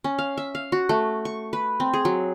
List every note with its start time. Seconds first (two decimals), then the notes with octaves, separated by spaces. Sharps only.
0.04 C#4
0.19 F5
0.37 E5
0.55 F5
0.72 F#4
0.89 A3
1.25 C#6
1.53 B4
1.80 C4
1.93 G#4
2.05 F#3